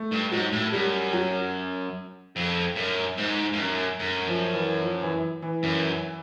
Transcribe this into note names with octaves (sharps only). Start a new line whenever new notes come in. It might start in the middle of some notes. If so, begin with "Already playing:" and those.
Already playing: A3
G2
G#2 F#3
A2
F#2 G3
F#3
F2
F#2
G#2
G2
F#2
F#2
F3
E3
F3
E3
E3
F#2 E3